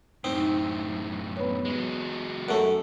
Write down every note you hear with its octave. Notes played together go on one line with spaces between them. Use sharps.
F#2 A2 C4 D#4
B3 B4 C#5
F#3 G#3
F#2 A3